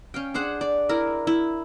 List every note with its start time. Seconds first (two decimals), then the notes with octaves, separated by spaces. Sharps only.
0.14 C#4 F5 G5
0.34 D4 G#4 C5 F#5
0.61 D5
0.89 E4 A#4
1.27 E4